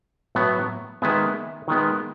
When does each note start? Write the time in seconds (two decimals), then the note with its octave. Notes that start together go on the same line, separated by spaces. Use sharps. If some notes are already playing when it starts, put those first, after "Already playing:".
0.35 A2 F#3 B3
1.02 D#3 G#3 B3 E5 G#5
1.68 D#3 G#3 B3